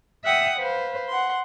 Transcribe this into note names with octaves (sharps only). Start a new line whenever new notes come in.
E5 F#5 G5 D#6
B4 C5 F5
F#5 C6